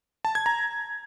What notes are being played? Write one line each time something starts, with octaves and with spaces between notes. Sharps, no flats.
A5
G#6
A#5